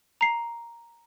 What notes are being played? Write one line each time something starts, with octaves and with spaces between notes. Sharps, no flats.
A#5 C7